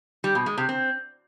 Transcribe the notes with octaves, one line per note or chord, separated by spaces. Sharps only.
G3
B2
G#3
C3
C4